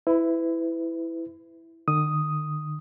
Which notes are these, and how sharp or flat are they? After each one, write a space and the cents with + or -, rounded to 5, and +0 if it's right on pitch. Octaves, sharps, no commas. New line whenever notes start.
E4 +0 B4 +30
D#3 -45 D#6 +0